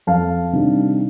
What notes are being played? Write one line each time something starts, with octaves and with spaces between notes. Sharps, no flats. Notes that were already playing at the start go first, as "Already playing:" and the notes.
F2 F5 A5
C3 D#3 G3 D4